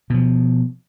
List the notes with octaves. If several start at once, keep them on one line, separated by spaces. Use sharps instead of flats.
B2 F3